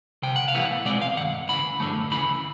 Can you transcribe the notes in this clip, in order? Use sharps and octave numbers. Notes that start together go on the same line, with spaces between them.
C2 C3 G5
F#5
F5
A2 E3 G3 B3 E4
F#5
B2 G#3 C4 D5
F5
G2 D#3 F#5
D2 C#3 E3 B5
G2 D3 F3 A3
D2 C#3 E3 B5